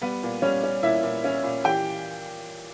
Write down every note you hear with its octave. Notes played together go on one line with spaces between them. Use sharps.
G3 B3 B4
A#2
G3 C#4 C#5
C#4
A#2 E4 E5
A#2
C#4
A#2
E3 G4 G5